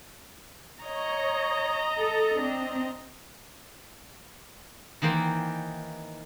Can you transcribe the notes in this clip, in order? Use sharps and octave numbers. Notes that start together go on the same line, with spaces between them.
C#5 D#5 A#5
A4
C4 D4
D#3 E3 A#3 C5 G5